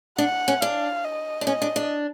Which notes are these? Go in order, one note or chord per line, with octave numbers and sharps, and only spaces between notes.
D4 F#5
C#4
D4 F5
D#5
D4
C#4 D#5
D4
D4